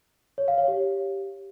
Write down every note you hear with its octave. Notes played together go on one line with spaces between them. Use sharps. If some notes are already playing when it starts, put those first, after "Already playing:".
C#5
F5
C#5
G4